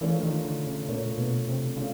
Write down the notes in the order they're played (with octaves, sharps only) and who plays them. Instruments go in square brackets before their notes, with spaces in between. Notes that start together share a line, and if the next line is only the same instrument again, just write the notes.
[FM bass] E3 [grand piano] A3 D4 F4 A#4 C#5
[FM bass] D#3
D3
C#3
[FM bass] A#2 [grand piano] A3 D4 F4 A#4 C#5
[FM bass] B2
C3
[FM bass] C#3 [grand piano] A3 D4 F4